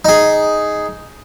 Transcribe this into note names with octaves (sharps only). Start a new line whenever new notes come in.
D#4 G#4